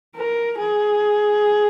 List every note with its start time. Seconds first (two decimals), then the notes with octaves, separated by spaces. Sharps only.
0.16 A#4
0.59 G#4